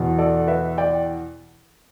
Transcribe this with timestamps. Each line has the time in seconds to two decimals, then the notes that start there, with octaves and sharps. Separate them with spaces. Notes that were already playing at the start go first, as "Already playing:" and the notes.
Already playing: E2 B2
0.18 A4 D5
0.47 B4 E5
0.78 D5 G5